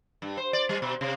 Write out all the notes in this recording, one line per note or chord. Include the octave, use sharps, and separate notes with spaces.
G2
C5
D5
G3
B2
C3